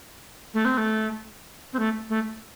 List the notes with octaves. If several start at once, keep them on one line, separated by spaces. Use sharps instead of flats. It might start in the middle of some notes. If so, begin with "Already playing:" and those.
A3
C4
A3
C4
A3
A3